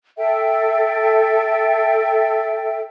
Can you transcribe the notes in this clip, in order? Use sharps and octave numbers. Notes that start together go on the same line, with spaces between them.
A4 E5 G5